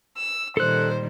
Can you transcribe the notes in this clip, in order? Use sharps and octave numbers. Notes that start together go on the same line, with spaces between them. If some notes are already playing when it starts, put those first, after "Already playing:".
E6
A#2 D#3 G3 A4 C5 F#6